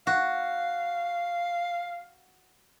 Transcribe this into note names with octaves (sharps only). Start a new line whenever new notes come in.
F#4 F5